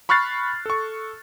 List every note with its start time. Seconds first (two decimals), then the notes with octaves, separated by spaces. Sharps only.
0.09 B5 C#6 F6 F#6 A6 C7
0.66 A4 C#6